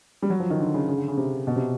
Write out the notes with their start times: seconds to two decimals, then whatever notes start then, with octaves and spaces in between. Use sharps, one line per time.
0.22 G3
0.30 F#3
0.40 F3
0.50 D#3
0.60 D3
0.74 C#3
0.88 C#3
0.98 D3
1.08 C#3
1.17 C3
1.47 B2
1.56 C3